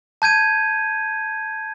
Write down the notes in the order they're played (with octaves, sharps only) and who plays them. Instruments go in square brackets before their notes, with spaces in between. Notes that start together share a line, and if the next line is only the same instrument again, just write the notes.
[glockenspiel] A5 G6 G#6 D#7